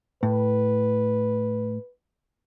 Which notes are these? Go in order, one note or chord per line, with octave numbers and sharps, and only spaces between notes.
A2 B4